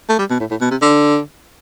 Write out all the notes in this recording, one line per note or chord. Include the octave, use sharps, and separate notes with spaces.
A3
G3
B2
A2
A2
B2
C3
D3